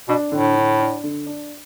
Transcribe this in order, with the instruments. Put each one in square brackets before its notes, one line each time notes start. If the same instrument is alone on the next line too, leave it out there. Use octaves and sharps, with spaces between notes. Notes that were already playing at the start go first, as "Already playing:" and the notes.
[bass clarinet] B2 [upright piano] D4
[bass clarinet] A2 [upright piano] D3
[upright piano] D3
D4
D3
D4